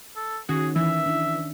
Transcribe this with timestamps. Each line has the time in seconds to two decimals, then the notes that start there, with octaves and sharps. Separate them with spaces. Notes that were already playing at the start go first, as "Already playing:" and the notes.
0.16 A4
0.49 D#3 C#4 F#4 G#4
0.76 E3 E5
1.06 D4